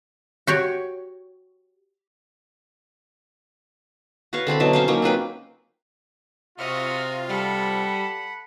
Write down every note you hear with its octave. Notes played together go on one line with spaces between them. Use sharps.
F#4 G4 C#5
F#4 B4 C#5 F5
D3 C4 C5 B5
B2 F#3 E5 A5
C#4 C5 F5
F#3 A#3 C#4 D#4
C4 F4 B4 G5
C3 F4 F#4 D#5 E5 F#5 F6
G3 A4 F#5 B5